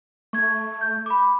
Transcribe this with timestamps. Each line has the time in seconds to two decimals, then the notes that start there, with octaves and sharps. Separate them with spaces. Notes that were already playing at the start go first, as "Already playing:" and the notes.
0.33 A3 C#6 G#6
0.81 G6
1.06 B5 D6